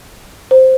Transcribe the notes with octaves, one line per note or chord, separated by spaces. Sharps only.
C5